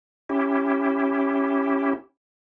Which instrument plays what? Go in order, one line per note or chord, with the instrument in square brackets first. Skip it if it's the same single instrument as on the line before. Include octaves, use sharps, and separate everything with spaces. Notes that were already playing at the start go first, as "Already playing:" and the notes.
[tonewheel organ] C#4 E4 G4